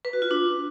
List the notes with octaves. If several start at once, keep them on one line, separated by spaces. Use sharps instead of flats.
B4
F#4
F4
D4